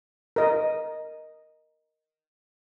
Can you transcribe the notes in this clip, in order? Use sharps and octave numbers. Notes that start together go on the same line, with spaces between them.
A#4 D#5